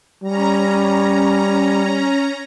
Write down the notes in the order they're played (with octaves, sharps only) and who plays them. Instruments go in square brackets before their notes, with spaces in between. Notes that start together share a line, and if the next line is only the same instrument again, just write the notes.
[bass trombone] G3 [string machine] C#4 A#5